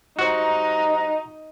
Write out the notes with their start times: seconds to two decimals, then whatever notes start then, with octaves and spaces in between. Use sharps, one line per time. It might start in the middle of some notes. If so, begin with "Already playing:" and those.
0.19 G3 D#4 F#4 C5 F#5 A#5 F#6